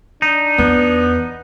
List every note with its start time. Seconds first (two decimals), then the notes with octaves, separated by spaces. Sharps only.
0.22 D4 D#4
0.58 E2 B3